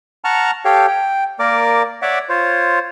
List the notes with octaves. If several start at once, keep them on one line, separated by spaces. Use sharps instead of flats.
F#5 A5 A#5 C#6 F6
G4 A4 C#5 F5 G5
G5
A#3 A#4 D5 D6
C#5 D5 E5 F#5 D6
F4 C5 C#5